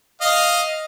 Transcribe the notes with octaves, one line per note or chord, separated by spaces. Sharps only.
D#5 F5